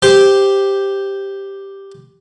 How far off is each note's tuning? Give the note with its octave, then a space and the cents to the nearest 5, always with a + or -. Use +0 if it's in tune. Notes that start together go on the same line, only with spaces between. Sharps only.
G4 +0 C5 -5